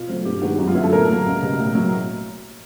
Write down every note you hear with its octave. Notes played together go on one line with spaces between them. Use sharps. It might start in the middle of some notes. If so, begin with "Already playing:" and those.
Already playing: B2 F4
F#3 A3 C4
G2 G4
D#3 G#3 B3 F#4
F#2 F#4
F4
D3 F#3 B3 E4
A4
A2 A#4
F#3 A#3
C#2
B2 G3 B3
A2
F#3 A#3